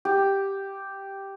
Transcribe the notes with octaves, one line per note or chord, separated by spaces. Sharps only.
G4